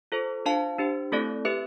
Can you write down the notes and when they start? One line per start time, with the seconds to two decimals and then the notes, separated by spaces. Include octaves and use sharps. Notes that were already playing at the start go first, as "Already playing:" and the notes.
0.12 F4 A4 C5
0.46 D4 F4 C5 F5 A5
0.79 D4 G4 C5
1.12 A3 C4 E4 A4 D5
1.45 C4 G4 B4 E5